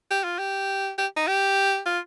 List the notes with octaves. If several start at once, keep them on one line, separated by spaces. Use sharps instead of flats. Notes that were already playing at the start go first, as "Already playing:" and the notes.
G4
F4
G4
G4
D#4
G4
F4